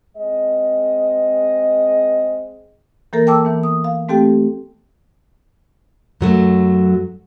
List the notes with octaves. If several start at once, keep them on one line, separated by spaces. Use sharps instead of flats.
G#3 C4 D#5
E3 A#3 A4 A#4
G5 A5 D6 E6
E3 B3
D#6
F5
A3 C4 G4 A4 G5
F#2 F#3 A3